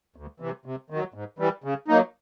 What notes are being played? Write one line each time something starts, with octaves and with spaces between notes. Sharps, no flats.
D2
C3 E3
C3
D#3 F#3
G#2
E3 G3
C#3
F#3 A#3 D#4